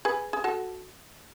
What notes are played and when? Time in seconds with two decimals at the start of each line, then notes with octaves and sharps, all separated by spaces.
0.05 G#4 B4
0.33 G#4
0.44 F#4 A4